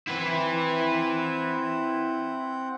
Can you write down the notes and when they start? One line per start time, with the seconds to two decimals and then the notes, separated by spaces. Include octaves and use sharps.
0.08 C4 E4 B4 F#5 G6